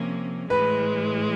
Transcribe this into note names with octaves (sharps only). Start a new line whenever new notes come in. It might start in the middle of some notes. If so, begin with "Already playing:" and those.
Already playing: C3 F3 A#3 C#4
A2 E3 G#3 B4